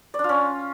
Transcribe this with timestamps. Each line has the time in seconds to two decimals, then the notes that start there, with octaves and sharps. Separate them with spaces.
0.14 D5
0.19 D4
0.24 F4
0.29 C#4